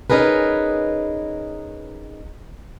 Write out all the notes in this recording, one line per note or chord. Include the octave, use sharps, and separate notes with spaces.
C#4 D#4 G#4 A#4 B4